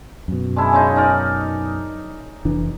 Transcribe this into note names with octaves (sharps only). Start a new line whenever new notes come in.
F#2 B2
G#3 D4 E4
C#3 G#3 D#4
D#4 A#4 D5
F1 E3 D4